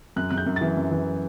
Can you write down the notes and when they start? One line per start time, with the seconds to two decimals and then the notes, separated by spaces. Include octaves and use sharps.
0.16 F#2 F#6
0.30 F#2 F#6
0.38 G6
0.46 F#2
0.56 E3 A6
0.77 F#2
0.91 E3